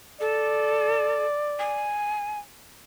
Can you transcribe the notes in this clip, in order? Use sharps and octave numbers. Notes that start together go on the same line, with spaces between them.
A4 D5
G#5